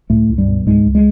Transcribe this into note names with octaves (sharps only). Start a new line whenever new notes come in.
C#2 A2 A3
C#2
G2 G3
B2
C#2 G#2 G#3
C#2
G#3